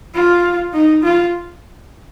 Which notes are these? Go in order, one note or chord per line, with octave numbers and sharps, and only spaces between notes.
F4
D#4
F4